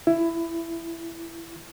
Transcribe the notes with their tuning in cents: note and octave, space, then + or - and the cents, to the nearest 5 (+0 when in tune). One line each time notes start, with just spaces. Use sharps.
E4 +15